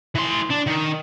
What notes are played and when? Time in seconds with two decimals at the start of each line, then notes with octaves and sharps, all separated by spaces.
0.15 E3 C6
0.51 D4
0.67 D#3